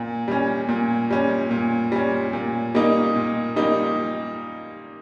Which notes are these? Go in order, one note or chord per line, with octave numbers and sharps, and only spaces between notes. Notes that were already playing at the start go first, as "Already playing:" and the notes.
Already playing: A#2
G3 C#4
A#2
G3 C#4
A#2
G3 C#4
A#2
G3 A#3 D#4
A#2
G3 A#3 D#4